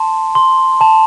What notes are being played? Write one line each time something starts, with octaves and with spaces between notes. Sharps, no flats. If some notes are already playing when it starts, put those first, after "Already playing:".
Already playing: A5 C6
C6
A5